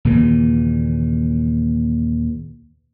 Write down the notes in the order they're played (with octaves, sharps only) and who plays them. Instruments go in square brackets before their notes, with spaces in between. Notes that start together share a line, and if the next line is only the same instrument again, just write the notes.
[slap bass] D#2 A#2 C#3 E3